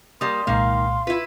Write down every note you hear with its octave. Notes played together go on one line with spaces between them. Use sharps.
G3 A#3 C6 D#6
C2 A#2 D#3 G#3 A#3 F5
E4 F4 B4